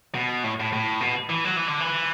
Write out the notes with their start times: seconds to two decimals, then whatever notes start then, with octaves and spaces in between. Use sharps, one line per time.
0.15 B2
0.44 A2
0.60 A2
0.72 A2
1.00 B2
1.30 E3
1.44 F#3
1.56 E3
1.68 D3
1.80 E3